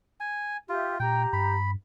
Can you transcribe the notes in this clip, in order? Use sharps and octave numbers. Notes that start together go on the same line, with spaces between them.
G#5
F4 G4 E5
A#2 G4 G5 A#5
G2 B5